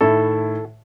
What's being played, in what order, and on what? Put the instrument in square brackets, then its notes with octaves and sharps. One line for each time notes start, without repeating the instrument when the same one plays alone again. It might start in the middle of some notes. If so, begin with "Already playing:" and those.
[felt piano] A2 D#3 E4 [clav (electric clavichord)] A4